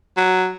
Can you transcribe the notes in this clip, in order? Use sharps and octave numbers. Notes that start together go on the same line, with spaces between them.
F#3